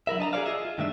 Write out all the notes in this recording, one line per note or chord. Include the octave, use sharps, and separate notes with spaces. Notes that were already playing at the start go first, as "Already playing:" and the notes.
F#3 E4 A#4 E5
D4 D#5 A5 A#5
F#4 G#4 A4 C5 D5 F5
F4 G#4 D#5 E5
F4
G2 D#3 A3 D4 E5